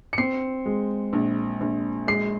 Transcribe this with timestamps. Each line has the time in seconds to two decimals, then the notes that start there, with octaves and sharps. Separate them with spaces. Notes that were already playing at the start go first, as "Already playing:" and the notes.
0.13 C#7
0.18 C4 C7
0.65 G#3
1.13 A#1
1.61 A#1
2.07 G#3 C7